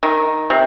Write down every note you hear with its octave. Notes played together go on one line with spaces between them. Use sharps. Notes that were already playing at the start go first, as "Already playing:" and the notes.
D#3
C3